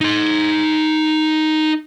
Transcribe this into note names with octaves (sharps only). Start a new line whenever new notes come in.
D#4 C6